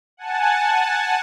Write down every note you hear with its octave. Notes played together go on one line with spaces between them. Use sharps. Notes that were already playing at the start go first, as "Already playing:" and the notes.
F#5 G#5 A5